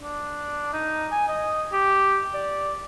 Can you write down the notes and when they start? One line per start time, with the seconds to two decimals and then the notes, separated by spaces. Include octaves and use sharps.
0.01 D4
0.73 D#4
1.11 G#5
1.28 D#5
1.72 G4
2.34 D5